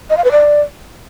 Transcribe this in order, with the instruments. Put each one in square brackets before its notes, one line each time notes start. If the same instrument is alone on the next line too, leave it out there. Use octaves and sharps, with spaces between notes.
[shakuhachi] D#5
F5
B4
D5